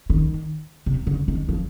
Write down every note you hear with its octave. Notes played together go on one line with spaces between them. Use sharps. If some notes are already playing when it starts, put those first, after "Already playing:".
D#3
C3
D3
D#3
F3